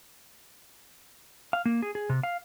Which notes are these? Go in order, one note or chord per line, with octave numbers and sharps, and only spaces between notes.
F5
A#3
G#4
G#4
C3
F5